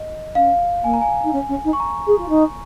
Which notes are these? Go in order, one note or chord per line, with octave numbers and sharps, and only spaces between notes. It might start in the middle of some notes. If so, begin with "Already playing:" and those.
Already playing: D#5
C#4 F5
A#3 G#5
A#5
G#5
D#4
C#4
C#4
D#4
C#6
A#5
G#4
F4
D#4